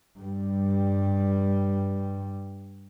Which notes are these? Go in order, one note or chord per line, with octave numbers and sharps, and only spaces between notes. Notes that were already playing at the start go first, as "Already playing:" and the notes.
G2 G3